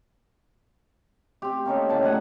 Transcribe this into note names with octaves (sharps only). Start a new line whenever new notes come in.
C4 G4
A#3 C#4 D#4 A4
A2 C#3 D4 A5
F#3 D#4 F#5 G#5